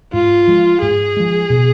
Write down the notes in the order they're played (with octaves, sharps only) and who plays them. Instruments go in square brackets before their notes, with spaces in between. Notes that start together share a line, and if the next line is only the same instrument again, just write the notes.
[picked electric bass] G#2 [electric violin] F4
[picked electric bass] F3 G#3
[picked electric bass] G#2 [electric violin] G#4
[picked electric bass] F3 G#3
B2